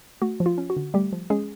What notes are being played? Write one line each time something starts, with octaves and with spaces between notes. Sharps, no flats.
A3 F#4
F3
F4
C#4
F#4
D3
G3 A3 G4
F3
G#3 C#4 G#4